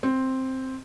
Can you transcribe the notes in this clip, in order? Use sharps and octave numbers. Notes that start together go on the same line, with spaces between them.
C4